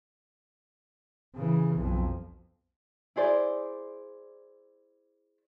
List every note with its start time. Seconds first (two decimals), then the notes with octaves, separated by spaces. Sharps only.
1.35 C#3 E3
1.76 B1 F2
3.16 E4 G#4 C5 D5